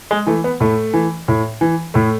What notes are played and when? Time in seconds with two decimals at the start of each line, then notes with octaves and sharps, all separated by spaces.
0.11 G#3
0.27 E3 A3
0.44 B3
0.60 A2 A3
0.94 E3
1.28 A2
1.61 E3
1.94 A2 A3